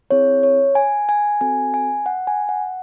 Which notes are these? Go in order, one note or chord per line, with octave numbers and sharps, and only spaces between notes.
C4 E4 G#4 C#5
C#5
G#5
G#5
C4 F#4 A4 G#5
G#5
F#5
G#5
F#5